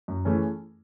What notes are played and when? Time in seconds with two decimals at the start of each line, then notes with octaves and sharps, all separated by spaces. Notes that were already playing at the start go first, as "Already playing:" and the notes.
0.08 F#2
0.25 E3 A3 C#4 G#4